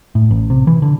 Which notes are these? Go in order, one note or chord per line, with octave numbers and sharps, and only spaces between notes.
A2
A1
C3
E3
D3